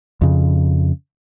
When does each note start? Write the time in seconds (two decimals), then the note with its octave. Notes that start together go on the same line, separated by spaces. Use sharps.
0.21 F2 C#3